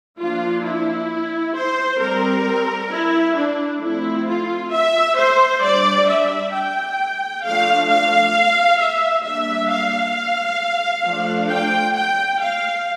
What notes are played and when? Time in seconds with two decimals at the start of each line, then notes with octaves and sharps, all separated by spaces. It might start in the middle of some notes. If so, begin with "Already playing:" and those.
0.19 F3 A#3 D4 F4
0.65 E4
1.56 C5
2.00 G3 C4 A#4
2.91 E4
3.36 D4
3.81 F3 A3 C4 E4
4.27 F4
4.73 E5
5.17 C5
5.62 G3 D4 D5
6.08 E5
6.53 G5
7.43 F3 A3 D4 F5
7.89 F5
8.80 E5
9.24 G3 A#3 D4 E5
9.70 F5
11.05 F3 A3 D4
11.50 G5
11.95 G5
12.41 F5